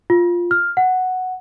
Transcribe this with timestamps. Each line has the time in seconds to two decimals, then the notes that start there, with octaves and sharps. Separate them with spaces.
0.10 F4
0.51 F6
0.77 F#5